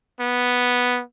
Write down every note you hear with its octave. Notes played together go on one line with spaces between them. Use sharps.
B3